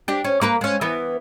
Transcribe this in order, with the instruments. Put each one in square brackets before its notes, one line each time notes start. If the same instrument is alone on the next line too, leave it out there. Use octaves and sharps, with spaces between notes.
[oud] D4 G4
C#4
A#3 A#4 B4
G#3 C#4
E3 B3